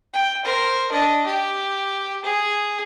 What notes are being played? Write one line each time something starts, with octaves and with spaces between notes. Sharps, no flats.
G5
A#4 C5
D4 D#5
G4
G#4